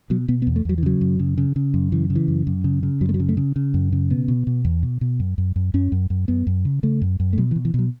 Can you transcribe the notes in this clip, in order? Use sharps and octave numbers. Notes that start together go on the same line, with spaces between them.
B2 F#3
B2 B3
B3
E2
A3
E2 F#3
E3
C#3 F#3
F#2
C#3
C#3
C#3
F#2
C#3 E3
C#3
E3
F#2
F#2
C#3
C#3
F#2 F#3
A3
F#3
C#3
A3
C#3
C#3
F#2
C#3
B2 B3
B2
B2
E2
B2
B2
F#2
F#2
F#2
F#2 C#4
F#2
F#2
F#2 B3
F#2
C#3
C#3 A3
F#2
F#2
A3
B2 F#3
E3
B2
E3
B2 F#3